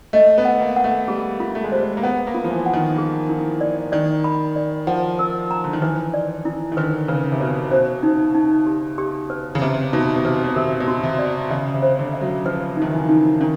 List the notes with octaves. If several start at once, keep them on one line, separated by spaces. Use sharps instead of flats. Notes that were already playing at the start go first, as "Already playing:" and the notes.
A3 D#5
B3
F#5
A#3
F#5
A3
G3 G#4
F4
A3
G#3
G3 C5
G#3
A#3
B3 F#5
A#3
F4
F3
E3
F#5
D#3
G#4
E4
D5
D#3 D5
B5
D5
F3 F#5
A#4
A#5
D3
D#3
E3 B4
D5
E4
D#3
D3 B4
C#3 B4
C3
B2 B4
B2 C5
D#4
D#4
G4
G4
B4
C#3
C3 B4
B2 D#4
B2
C3 B4
B2
C3 A#4
B2
F#4
C3
D5
C#3 E5
C3
C5
D3
E5
F#3
F3 B4
D#3 D#4
E3
D#4
D#3 D4